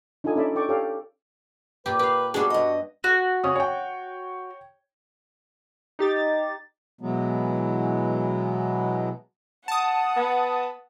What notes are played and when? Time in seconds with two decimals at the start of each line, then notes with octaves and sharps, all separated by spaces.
0.24 D4 D#4 F4 A4 G#5 D#6
0.36 C#4 D#4 A4 D5 E5 B5
0.56 A4 D5 G5 C#6 D6
0.69 G4 A4 C#5 D5 F5 G5
1.86 A#2 G4 B4
1.99 G4 B4 F5
2.34 G3 B3 D4 F#4 G#4
2.50 G2 D#5
3.04 F#4
3.44 C#3 C#4 D#6
3.56 C#5 G5
5.99 D#4 G4 A6
7.01 B2 E3 F#3 G#3 B3
9.68 F#5 A5 D#6
10.16 B3